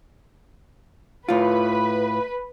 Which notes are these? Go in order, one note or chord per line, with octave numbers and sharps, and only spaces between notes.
A2 F4 B4